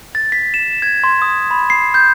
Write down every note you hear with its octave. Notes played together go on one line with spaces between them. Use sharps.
A6
B6
E7
G#6
C6
D#6
B5
C7
G6